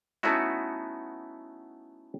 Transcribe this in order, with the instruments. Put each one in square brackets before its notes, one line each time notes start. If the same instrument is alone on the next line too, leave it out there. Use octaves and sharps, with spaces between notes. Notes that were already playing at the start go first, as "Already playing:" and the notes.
[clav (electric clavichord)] A3 B3 C#4 D#4 E4 F#4